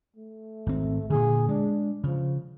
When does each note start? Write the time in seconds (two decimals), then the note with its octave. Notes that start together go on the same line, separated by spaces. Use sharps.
0.16 A3
0.67 G#1 C4
1.10 A#2 D3 G#4
1.49 G#3 D4
2.04 C#3 F3